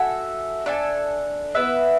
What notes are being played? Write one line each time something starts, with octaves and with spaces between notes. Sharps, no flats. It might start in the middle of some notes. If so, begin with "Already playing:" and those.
Already playing: F#4 A4 E5 G#5
D4 A4 E5 G#5
B3 E4 B4 E5